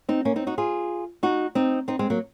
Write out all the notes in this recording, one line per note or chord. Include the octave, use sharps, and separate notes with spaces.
C4 D#4
A#3 C#4
C4 D#4
D#4 F#4
F4 G#4
D#4 F#4
C4 D#4
C4 D#4
G#3 C4
F#3 A#3